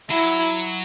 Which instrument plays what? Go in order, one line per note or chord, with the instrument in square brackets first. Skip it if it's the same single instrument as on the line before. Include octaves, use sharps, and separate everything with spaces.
[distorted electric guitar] F#3 [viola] E4